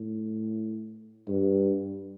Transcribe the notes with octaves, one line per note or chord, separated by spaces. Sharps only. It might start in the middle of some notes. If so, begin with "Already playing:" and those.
Already playing: A2
G2